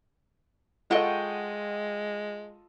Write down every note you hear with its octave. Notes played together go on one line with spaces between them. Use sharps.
G#3 F4 A4 D#5 F#5 G5 C#6